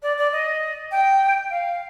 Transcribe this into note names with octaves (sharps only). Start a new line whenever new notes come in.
D5
D5
D#5
G5
F5